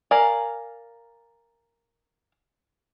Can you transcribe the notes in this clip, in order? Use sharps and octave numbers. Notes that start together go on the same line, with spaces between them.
A#4 D5 F5 G#5